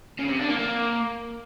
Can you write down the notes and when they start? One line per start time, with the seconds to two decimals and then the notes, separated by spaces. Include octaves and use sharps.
0.19 C#3
0.29 C3
0.39 D4
0.49 A#3
0.59 A#3